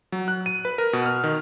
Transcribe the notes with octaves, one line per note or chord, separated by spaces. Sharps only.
F#3
F#6
D#7
B4
A#4
B2
F6
D#3